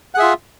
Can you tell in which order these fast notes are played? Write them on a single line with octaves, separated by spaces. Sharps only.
F#5 G#4 E5 F4